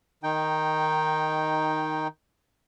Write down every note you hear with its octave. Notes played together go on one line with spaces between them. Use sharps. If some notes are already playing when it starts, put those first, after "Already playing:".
D#3 D#4 G5